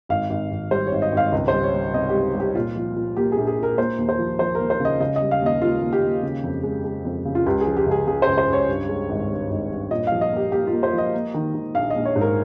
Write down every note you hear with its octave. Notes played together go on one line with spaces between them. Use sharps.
G#1 F5
G#1
G#1
G3 C5
G#1 C#5
D#5
G#1 F5
C#2 D#5
C5
G3
C#5
G3
C3 D#5
G4
G3
G3
G4
A#2 F4
F3
A#2
A#3 G4
G#4
A#1
G#4
A#2
A#4
A#3 C5
D#2
C5
F3
F3 C5
D#2 A#4
C5
C#3 D#5
C#3 D#5
D#5
G3
F5
D#2 D#5
D#2 F4
D#2
G4
D#2
C#3
F2
G#3
G#3
F2
C#3
F4
C#2 G4
G#4
F3
G4
C#2
G#4
C#3 G#4
C5
C#2
C5
C#2 C#5
G2
G#3
G#1
G2
G#1
G2
A#2 D#5
F3 F5
D#5
A#3 G4
A#3 G4
F4
A#3
C5
F3
D#5
A#3
D#3
D#3
A#1 F5
D#5
A#1
C#5
G#2
A#4